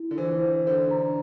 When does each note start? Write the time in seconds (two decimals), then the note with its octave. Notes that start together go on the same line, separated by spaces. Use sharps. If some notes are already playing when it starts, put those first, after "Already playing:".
Already playing: E4
0.11 D3
0.18 E3 C5
0.43 C5
0.67 D3 C5
0.91 A#5